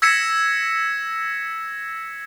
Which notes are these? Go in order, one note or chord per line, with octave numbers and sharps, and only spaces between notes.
E6 G#6 A#6 B6 C#7 E7